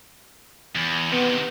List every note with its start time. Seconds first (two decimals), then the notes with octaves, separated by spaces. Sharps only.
0.75 E2
1.11 C3 D#3 B3